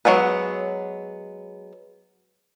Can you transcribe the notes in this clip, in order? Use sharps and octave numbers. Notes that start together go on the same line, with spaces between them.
F#3 G#3 B3 B4